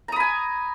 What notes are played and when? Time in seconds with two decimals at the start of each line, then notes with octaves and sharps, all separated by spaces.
0.08 A#5
0.12 D#6
0.16 B5
0.20 G#5